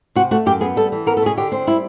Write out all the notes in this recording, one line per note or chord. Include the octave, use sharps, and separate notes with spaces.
C3 F#4
A3 F#4
F#2 G4
B3 G#4
G3 A4
E3
B3 A#4
A4
B2 G#4
D3 G4
C4
G3 E4